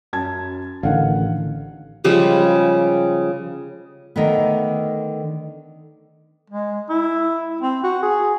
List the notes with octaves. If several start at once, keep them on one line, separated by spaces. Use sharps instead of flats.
F#2 A5 G#6
A1 D3 D#3 F5 F#5
C#3 F3 G3 G#3
D3 D#3 A3 B3
G#3
E4
C4
F#4
G#4